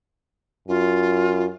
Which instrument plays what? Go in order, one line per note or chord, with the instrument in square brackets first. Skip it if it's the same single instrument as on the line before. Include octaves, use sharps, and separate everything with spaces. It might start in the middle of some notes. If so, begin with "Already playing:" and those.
[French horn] F#2 [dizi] F4